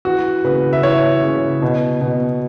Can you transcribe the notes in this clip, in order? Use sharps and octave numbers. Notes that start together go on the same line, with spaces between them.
E3 F#4
C#3 B4
E5
E3 C#5
C#3
B2
B2